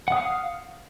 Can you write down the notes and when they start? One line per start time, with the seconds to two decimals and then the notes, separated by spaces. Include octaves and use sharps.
0.08 F#5
0.12 D#6
0.17 F5